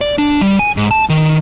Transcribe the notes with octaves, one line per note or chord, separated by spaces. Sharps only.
D5
D4
G3
G#5
G#2
A5
D#3